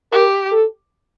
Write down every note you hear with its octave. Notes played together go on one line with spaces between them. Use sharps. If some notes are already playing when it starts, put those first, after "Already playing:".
G4 A#4
A4